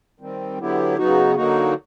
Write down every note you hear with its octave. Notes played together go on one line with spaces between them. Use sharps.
D#3 G3 C4
D3 F#3 B3 E4 G4
C#3 F#3 B3 D#4 F#4
D3 F#3 A#3 D#4 F#4